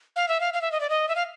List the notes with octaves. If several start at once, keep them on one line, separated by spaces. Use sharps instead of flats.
F5
E5
F5
F5
E5
D#5
D5
D#5
E5
F5